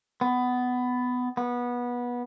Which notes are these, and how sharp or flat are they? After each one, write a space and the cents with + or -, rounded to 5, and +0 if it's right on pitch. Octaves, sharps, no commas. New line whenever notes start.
B3 +15
B3 -20